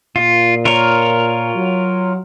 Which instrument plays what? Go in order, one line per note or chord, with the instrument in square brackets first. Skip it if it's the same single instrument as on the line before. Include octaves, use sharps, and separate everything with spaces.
[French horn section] A#2 [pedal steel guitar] F4
[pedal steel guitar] F4 A#4 C#5
[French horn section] F#3